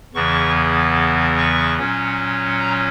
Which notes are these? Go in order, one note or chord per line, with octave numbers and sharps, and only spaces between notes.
E2 C#3 E3 B3 C#6
C#6
A#2 F#3 C#4
A#5